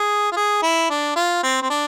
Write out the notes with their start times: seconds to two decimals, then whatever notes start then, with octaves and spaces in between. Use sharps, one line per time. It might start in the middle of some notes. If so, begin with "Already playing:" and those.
Already playing: G#4
0.32 F4
0.36 G#4
0.62 E4
0.90 D4
1.16 F4
1.43 C4
1.62 C4
1.70 D4